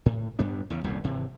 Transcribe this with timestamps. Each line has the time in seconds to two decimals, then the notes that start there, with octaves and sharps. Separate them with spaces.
0.06 A2
0.39 G2 G3 B3 D4
0.70 E2 C#3
0.84 D#1 C2 F#2 A#2
1.04 G#1 C3 E3